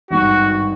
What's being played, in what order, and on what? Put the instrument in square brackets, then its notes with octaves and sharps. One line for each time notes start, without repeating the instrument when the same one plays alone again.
[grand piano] G#1 G2 D#3 [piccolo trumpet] F#4